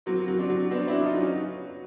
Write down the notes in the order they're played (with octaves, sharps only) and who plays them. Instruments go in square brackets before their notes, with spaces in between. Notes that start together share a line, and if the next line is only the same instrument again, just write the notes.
[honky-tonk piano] F#3 [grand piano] A#3 C4
[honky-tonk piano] F#3
[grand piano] C4 D4
[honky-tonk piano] F#3
[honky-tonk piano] B3 [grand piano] C4 D4
[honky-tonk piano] F#3 [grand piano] D4 E4
[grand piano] D#4 F4
[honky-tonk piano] F#3
[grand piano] C#4 D#4